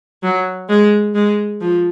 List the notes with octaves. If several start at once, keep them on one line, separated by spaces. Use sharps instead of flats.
F#3
G#3
G#3
F3